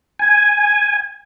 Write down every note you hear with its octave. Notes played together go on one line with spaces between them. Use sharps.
G#5